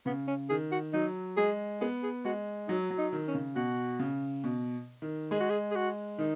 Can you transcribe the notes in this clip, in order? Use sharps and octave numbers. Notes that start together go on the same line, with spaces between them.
C#3 B3
C#4
D#3 G#4
F#4
F#3 D#4
G#3 G#4
B3 G#4
G#4
G#3 F#4
F#3 D#4
F#3
D#4
D#3
C#4
C#3
B2 F#4
C#3
B2
D#3
G#3 G#4
F#4
G#4
G#4
F#4
D#3 D#4